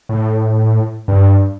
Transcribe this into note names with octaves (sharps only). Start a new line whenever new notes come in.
A2
G2